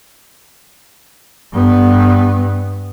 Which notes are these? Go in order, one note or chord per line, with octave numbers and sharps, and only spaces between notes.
G2 B3